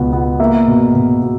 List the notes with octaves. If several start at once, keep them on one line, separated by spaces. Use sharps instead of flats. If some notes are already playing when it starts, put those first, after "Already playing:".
Already playing: C#2 B2 B3
B3
A#3 E5
B2
B2
B2